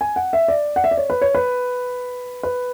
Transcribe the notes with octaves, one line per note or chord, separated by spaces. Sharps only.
G#5
F#5
E5
D5
F#5
E5
D5
C#5
B4
C#5
B4
B4